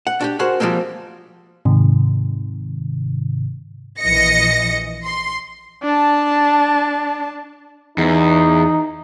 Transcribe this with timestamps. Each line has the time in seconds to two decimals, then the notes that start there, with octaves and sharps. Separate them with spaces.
0.07 F#5
0.21 D4 F#4 G4
0.39 F#4 G#4 A#4 C5 F#5
0.60 F3 G3 G#3 A#3 C4
1.65 G#2 C3 D#3
4.01 A#1 E3 D#5 A#6 C#7
5.05 C6
5.83 D4 A5
7.98 E2 D#4